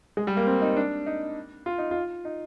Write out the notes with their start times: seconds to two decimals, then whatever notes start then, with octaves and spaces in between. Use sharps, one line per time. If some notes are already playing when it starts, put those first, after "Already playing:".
0.17 G#3
0.27 G3
0.37 A#3
0.47 C4
0.62 D#4
0.77 D4
1.06 D#4
1.66 F4
1.78 D#4
1.91 F4
2.25 D#4